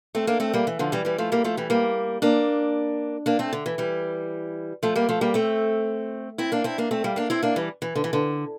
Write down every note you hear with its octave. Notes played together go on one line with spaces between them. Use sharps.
A3 C4
A#3 D4
A3 C4
G3 A#3
E3
D3 F3
E3 G3
E3 G3
F3 A3
G3 A#3
F3 A3
E3 G3
G3 A#3
A#3 D4
A#3 D4
A3 C4
D3
E3
E3 G3
F3 A3
G3 A#3
F3 A3
G3 A#3
A3 C4
C4 E4
A#3 D4
C4 E4
A#3 D4
A3 C4
G3 A#3
A#3 D4
C4 E4
A#3 D4
E3 G3
E3
D3
E3
D3